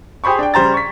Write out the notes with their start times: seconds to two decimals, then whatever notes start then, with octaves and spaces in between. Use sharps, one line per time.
0.24 G4 G#4 C5 B5 C#6
0.39 D4 G5
0.54 C#3 G3 C5 A#5 A6
0.74 C#6 B6